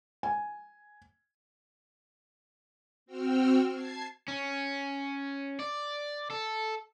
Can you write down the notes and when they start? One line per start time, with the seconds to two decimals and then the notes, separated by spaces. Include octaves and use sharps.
0.23 G#5
3.06 C4 F#4 G5 E6 F6
3.70 A5 G#6 C7
4.28 C#4
5.60 D5
6.30 A4